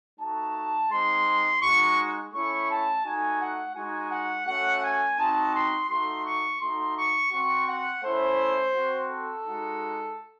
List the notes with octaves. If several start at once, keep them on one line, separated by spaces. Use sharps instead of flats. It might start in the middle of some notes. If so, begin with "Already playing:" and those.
A3 D#4 F#4 A5
G#3 C4 D#4 C6
G#3 D#4 F#4 C#6
A3 C#4 E4 C#6
A5
A3 D#4 F#4 G#5
F#5
G#3 D#4 F#4 G#5
F#5
A3 C#4 F#4 F#5
G#5
C4 D#4 F#4 A5
C6
A3 D#4 F#4 C6
C#6
A3 D#4 F#4 C6
C#6
C4 F#4 C#6
F#5
A3 C#4 E4 C5
C4 F#4
A4
G#3 D#4 F#4